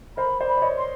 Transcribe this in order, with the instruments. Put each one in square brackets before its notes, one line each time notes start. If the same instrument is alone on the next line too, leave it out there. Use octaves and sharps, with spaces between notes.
[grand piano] A#4 C5 [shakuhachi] B5
[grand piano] C5 D5
[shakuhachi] B5
[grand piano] D5
C#5 D#5
[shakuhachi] C6